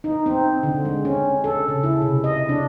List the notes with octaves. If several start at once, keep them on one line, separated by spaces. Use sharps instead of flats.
D#4
C4
D3
G#3
C#4
A4
C#3
E4
C3
D#5
D4